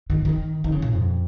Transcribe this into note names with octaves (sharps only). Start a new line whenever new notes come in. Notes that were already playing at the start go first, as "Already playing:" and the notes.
D#3
D#3
D#3
C#3
A#2
F2